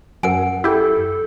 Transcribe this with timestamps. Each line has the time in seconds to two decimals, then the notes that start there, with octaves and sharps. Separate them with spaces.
0.23 F#2 A#4 F#5 G#5
0.64 E4 G4 A4